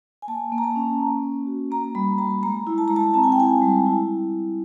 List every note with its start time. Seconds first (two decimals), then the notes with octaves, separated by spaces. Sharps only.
0.22 G#5
0.28 A#3 A5
0.52 A#3
0.58 A#5
0.64 A5
0.76 C#4
1.00 A#3
1.23 A#3
1.47 F#4
1.71 A#3 A#5
1.95 G3 B5
2.18 G3 A#5
2.43 G#3 A#5
2.67 E4
2.78 A5
2.88 G#3 A#5
2.96 A5
3.14 C4 A5
3.24 G#5
3.32 G5
3.39 E4 G#5
3.62 G3
3.86 E4